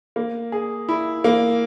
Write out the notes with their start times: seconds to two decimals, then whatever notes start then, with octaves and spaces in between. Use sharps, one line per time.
0.16 A#3
0.52 G#4
0.89 E4
1.24 A#3